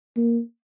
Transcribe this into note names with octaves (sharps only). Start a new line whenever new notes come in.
A#3